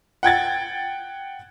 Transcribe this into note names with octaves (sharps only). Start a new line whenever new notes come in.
F#5 G5 G#6 A6